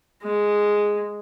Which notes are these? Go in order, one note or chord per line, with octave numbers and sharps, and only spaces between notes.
G#3